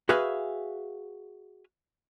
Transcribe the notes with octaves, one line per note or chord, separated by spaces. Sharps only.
F#4 G#4 B4 E5 F5 G#5